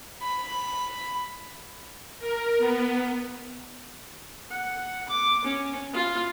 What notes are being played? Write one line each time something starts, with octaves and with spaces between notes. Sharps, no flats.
B5
A#4
B3
F#5
D6
C#4
F4